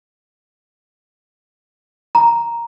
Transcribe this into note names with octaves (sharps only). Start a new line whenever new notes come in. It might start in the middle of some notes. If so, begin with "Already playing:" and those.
A#5